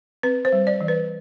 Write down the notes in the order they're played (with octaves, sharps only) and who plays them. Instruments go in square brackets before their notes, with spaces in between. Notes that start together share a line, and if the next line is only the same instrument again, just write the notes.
[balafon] C4 B4
C5
G3
D5
E3
B4